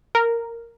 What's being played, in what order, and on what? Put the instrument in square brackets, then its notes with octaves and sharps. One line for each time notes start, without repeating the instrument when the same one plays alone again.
[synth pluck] A#4